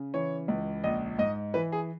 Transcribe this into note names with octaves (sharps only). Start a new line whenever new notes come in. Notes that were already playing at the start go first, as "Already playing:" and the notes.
Already playing: C#3
E3 C#5
C#2
A#1 D#5
G#2 D#5
E3 B4
G#4